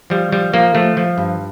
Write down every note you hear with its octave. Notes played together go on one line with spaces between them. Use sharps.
F3 G3
F3 G3
F3 A#3
F3 A3
F3
G2